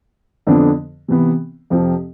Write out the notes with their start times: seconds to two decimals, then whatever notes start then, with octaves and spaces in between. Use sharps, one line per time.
0.47 F2 D3 F3 B3 D4
1.08 C3 E3 B3
1.70 F2 C3 F3 C4 G4